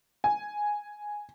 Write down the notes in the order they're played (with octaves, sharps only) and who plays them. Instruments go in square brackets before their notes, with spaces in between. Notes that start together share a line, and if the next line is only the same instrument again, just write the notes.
[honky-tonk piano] G#5